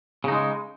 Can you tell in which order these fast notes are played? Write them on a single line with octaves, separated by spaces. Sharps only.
C#3 D#4 G#3